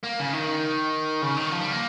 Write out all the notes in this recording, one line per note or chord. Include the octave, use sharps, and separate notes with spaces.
A#3
C#3
D#3
C#3
D#3
F3
G3
A#3